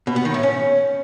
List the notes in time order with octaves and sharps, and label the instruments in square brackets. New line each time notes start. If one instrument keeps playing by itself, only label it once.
[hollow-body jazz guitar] B2
B3
D#3
A2
C#4